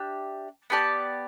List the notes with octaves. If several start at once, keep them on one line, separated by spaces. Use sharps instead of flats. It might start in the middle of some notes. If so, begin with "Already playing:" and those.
Already playing: D4 G4 E5
B3 G4 D5 A5